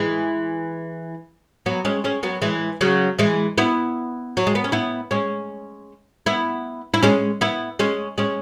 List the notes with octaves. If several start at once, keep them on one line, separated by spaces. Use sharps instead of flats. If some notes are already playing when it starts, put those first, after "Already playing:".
Already playing: E3 G#3
F#3 B3
G#3 C#4
G#3 C#4
F#3 B3
E3 G#3
C#3 F#3
E3 G#3
B3 E4
F#3
G#3
B3
C#4
B3 E4
G#3 C#4
B3 E4
E4
G#3 C#4
B3 E4
G#3 C#4
G#3 C#4